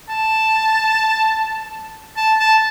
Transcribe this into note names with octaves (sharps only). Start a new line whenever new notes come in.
A5
A5
A5